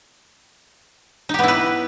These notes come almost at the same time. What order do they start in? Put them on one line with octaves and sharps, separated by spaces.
D#4 G4 B3 E4 B4